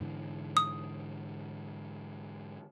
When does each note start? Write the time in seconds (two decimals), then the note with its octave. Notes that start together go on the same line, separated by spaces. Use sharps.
0.01 G#2 D3 E3
0.57 D#6